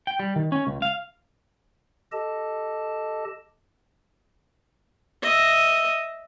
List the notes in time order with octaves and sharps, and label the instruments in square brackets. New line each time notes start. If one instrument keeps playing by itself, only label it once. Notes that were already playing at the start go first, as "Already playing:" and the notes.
[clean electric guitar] G5
G3
D#3
C#4
C#2
F5
[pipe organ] G4 A4 D#5 A5
[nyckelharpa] D#5 E5